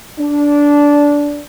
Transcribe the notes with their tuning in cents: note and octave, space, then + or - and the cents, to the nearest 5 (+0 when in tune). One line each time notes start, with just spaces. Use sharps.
D4 -15